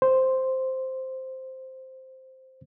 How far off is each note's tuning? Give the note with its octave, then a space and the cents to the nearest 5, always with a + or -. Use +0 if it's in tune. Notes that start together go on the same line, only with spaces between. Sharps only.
C5 +0